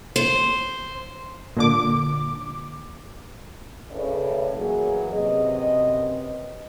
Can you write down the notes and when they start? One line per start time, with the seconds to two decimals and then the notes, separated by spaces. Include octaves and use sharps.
0.16 C5
1.57 A#2 D3 D6
3.91 A2 C#3 A3 B4 C#5 D5
4.56 E3 F#3 A#3 G#4
5.11 F#2 C3 B4 D#5